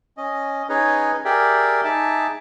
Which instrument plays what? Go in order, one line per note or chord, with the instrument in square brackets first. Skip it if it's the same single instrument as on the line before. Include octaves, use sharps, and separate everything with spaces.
[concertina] C#4 D#5
C#4 D#4 G#4 B4 C#5 D#5
G4 G#4 A#4 D5 E5 G5
D#4 G#4 E5 A5 D6